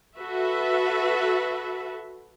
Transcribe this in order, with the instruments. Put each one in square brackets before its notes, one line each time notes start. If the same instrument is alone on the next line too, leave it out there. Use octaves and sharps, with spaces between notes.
[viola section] F#4 A4 B4 E5